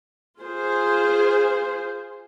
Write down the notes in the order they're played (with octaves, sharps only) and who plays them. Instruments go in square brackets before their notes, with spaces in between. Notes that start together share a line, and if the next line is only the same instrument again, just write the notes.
[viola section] F4 G#4 C5